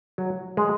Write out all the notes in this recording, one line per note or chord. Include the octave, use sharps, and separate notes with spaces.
F#3
G#3